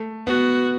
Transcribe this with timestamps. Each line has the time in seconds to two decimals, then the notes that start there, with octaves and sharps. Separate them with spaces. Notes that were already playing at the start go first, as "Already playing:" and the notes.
Already playing: A3
0.27 B3 F#4